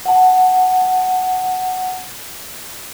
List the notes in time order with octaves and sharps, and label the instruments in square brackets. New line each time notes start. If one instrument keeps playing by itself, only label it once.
[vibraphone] F#5 A5